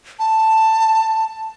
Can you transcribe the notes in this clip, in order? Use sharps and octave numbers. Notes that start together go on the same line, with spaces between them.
A5